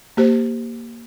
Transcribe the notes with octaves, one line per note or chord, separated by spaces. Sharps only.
A#3 G4 C5